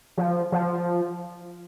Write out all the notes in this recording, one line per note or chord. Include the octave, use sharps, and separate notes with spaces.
F3
F3